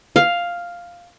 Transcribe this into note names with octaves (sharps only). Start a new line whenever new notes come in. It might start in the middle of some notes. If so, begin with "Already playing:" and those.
F5